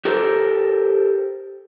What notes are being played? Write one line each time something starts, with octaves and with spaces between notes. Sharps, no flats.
G4 A4 A#4 C5